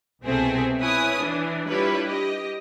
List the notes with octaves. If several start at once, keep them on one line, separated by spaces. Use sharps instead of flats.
C2 B2 C4 G#4 A4 E5
E4 B4 C#5 G#5 D#6
E3 D4
G3 D4 E4 F4 B4 C#5
G4 D#5